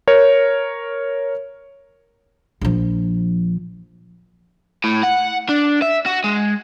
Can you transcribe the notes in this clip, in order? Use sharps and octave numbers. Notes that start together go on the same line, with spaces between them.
A#4 C#5
A#1 F3
A2
F#5
D4
E5
F#4
G#3